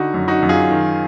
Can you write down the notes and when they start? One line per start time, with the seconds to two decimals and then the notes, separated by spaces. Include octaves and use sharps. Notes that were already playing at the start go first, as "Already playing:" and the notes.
Already playing: D3 D#4 F#4
0.14 F#2
0.28 D#4 F#4
0.42 F#2
0.49 F4 G#4
0.71 D#3